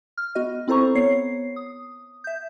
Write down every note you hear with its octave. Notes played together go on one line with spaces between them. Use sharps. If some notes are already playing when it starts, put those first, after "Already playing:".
F6
B3 F#4 D#5
C4 E4 A4 C5 A#5 C#6
B3 C#5 C7
D#6
E5 G6